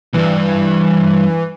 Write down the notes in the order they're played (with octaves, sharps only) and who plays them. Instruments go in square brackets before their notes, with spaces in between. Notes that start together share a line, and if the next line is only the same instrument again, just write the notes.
[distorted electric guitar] C2 G2 [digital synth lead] E3